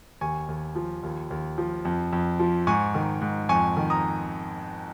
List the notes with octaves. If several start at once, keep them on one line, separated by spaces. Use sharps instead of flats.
D#2 G#5 C#6
D#2
F3
D#2
D#2
F3
F2
F2
F3
G#2 G#5 C#6
D#3
G#2
F2 G#5 C#6
D#3
A#5 D#6